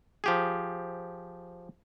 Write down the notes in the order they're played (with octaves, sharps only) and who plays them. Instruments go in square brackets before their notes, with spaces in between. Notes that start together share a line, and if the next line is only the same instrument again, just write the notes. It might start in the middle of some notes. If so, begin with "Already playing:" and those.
[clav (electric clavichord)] F3 G4 G#4